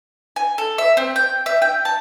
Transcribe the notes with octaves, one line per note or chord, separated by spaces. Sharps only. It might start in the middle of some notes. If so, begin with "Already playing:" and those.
G#5
A4
E5
C4
G5
E5
G5
A5